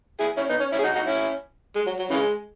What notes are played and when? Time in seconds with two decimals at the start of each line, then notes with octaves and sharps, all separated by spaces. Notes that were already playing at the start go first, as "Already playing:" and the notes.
0.20 E4 G#4
0.37 C#4 E4
0.49 B3 D#4
0.60 C#4
0.72 C#4 E4
0.79 G#4
0.84 D#4 F#4
0.95 D#4 F#4
1.06 C#4 E4
1.76 G#3
1.87 F#3
1.99 F#3
2.10 C#3 E3 G#3